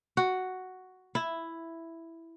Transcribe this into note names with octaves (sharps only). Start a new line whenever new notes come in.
F#4
E4